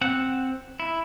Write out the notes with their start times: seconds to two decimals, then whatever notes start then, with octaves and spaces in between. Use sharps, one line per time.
0.01 C4 F#5
0.80 E4